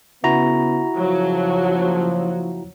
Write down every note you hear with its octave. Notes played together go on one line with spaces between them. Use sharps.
C#3 B3 E4 F#4 A#5
F#1 F3 F#3